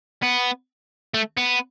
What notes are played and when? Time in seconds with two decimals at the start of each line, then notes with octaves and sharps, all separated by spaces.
0.23 B3
1.14 A3
1.37 B3